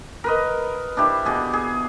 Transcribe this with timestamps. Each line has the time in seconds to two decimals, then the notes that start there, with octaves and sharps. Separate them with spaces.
0.24 A#4 B4 D#5
0.97 D4 E4 G4 C5
1.25 B2 G4 G#4
1.53 G#4